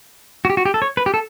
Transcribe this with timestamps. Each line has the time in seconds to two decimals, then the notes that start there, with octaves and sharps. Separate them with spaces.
0.45 F#4
0.50 G4
0.57 F#4
0.65 G4
0.74 A4
0.82 C#5
0.97 B4
1.06 G4
1.14 A4